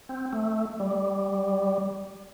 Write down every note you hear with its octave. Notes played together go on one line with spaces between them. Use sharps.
C4
A3
G3